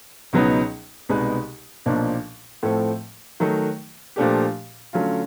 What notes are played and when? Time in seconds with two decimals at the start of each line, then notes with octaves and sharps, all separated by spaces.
0.33 C#2 B2 F#3 B3 D#4
1.09 C2 B2 G#3 B3 D#4
1.86 B1 A#2 F3 A#3 D4
2.63 A2 F3 A3 C4
3.40 D#3 F#3 A3
4.16 A#2 F3 A3 D4 G4
4.93 D3 F#3 A3 C#4 F4